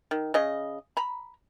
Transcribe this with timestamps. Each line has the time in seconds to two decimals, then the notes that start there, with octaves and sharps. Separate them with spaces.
0.11 D#3
0.34 C#3 D#5
0.97 A#5 B5